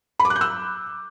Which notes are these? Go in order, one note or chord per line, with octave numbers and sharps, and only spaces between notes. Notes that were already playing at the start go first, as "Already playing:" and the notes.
B5
D6
F#6
G6
E6